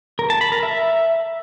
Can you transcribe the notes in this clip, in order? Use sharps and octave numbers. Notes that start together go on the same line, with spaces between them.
A#4
A5
B5
A#4
E5